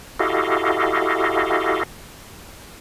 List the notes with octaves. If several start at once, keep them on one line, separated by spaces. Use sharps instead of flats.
E4 F#4 G4 A4 D#5 F5